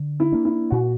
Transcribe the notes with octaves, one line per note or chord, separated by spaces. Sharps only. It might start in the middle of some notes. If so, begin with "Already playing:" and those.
Already playing: D3
E4
A#3 D4
E4
A#2 F#4